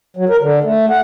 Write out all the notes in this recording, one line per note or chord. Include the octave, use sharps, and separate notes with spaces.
F#3
A#4
D3
A3
F#5